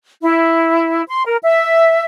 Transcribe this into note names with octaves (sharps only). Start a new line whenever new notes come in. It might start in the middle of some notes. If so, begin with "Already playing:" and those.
E4
C6
A#4
E5